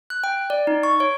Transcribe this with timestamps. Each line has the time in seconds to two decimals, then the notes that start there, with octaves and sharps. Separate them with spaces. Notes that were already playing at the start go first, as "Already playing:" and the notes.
0.10 F#6
0.24 G5
0.50 D5
0.67 D#4
0.83 C#6
1.00 C#5